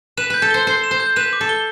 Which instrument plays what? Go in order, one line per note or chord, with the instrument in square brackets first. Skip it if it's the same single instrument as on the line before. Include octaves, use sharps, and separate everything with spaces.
[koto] B4 [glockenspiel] E7
[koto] B4 [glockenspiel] G6
[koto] A4
[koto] C5 [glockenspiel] G7
[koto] C5 [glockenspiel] C7
[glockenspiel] E7
[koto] C5
[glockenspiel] G6
[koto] B4 [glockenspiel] E7
[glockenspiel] D6
[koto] A4
[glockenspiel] G7